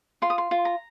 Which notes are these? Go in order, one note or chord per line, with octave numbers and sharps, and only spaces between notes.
F4 C6
D#6
C6
F4
A#5